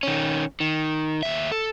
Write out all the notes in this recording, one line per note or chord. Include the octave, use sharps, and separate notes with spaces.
D#3 C#4
D#3
D#2 E5
A4